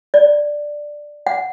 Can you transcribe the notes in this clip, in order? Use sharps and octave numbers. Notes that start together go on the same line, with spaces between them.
D5
F#5